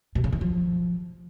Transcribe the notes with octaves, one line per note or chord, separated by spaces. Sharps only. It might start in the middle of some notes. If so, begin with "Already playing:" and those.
B2
C#3
D#3
F3